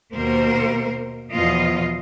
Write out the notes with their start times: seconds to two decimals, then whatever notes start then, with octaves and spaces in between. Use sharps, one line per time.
0.14 D#2 B2 A#3 A#4 C5
1.31 E2 B2 F3 F4 D#5